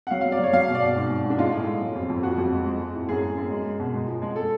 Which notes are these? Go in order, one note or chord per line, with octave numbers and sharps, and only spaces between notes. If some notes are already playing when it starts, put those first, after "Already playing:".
F#5
F#3 F5
F#3 F5
D5
F#3 C#5
F#3 F5
B2
D5
B2
G#2
G#2
G#2
D4
G#3 F4
A2
G#3
F#3
F2
F2
F3 F#4
F2
G#3
G#3
G#3
A2
F#2 G#4
F#2
F#2
G#3
G#3
B2
G#3
F3
G#3
A4